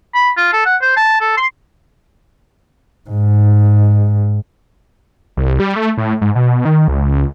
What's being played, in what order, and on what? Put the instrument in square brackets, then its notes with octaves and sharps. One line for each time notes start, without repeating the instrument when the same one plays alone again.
[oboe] B5
F4
A4
F#5
C5
A5
A4
C6
[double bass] G#2
[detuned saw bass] C2
G3
A3
A2
G#2
B2
D#3
C#2